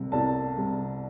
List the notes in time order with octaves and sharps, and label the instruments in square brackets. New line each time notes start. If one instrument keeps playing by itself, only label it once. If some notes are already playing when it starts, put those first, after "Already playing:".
Already playing: [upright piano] C2 C3 G3
C2 A5
C3 G3